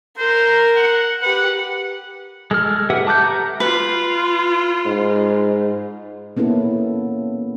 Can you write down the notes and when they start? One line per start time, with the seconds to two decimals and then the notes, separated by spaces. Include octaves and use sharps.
0.18 A#4 C5
0.76 F#5
1.22 G4 B4 F#5
2.51 G#3 A4 F6
2.90 G4 B4 E5 F#5
3.07 A5 D6 F#6 G6
3.22 A4 E5 A#5
3.60 F4 B4
4.85 G#2
6.37 A#3 B3 C#4 E4 A4